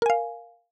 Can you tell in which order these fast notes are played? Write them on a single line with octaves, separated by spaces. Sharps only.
A#4 G#5 F5